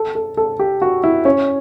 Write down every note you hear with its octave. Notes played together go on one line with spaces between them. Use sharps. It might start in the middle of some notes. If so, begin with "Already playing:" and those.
Already playing: A4
A4
A4
G4
F#4
E4
C#4